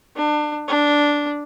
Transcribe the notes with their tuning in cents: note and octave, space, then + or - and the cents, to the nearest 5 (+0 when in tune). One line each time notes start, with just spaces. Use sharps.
D4 +30
D4 -5